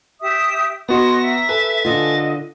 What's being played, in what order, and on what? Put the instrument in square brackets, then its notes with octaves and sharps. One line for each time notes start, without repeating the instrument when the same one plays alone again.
[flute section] G4 E5 D#6
[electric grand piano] B3 F#4 [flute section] D#5 C6 C#6 [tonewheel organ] A#5
[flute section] E5
[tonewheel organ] A4 G#5 A5 [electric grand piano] B4
[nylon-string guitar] D3 F4 [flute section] D#5